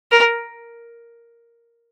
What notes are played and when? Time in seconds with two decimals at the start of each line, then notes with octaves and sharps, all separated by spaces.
0.12 A#4